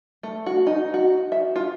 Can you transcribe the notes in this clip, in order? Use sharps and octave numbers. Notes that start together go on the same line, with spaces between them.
A3
F#4
D#4
F#4
E5
F4